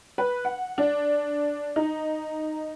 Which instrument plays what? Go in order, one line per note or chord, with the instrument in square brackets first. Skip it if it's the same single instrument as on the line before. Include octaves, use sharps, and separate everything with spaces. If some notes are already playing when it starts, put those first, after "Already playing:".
[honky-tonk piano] B4
F#5
D4
D#4